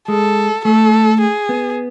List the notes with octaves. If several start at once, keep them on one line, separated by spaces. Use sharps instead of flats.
G#3 A4
A3 A4
G#4
B3